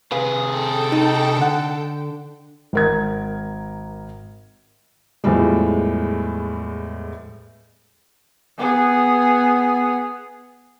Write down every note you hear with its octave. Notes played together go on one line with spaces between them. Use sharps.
C3 G#4 B4 F5
A4 G5
D#4
D3 F#5
G#1 A#4 G#6
E2 A2 F3 G3 G#3
B3 G#4